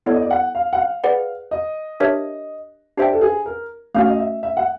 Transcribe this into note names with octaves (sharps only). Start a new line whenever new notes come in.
B3 E4 A4 C#5 D5
D#5
D5
F#5
F5
F#5
F5
G#4 B4 D5 F#5
D#5
D4 G4 A#4 C#5 E5
D4 G4 C5 D5 E5 G5
A4
G#4
A#4
A3 C#4 F#4 F5
D#5
E5
E5
F#5